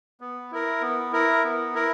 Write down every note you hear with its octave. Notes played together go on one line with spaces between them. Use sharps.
B3
E4 A#4
B3
E4 A#4
B3
E4 A#4